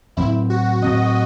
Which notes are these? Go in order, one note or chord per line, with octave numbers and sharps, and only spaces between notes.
A2 F#3 C4 E4
F#4
A2 F#3 C4 D#5